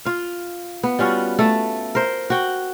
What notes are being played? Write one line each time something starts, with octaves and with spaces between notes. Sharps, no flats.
F4 F5
B3
G3 C#4 F4 F#4
A3 A4
A#4 C5
F#4 G5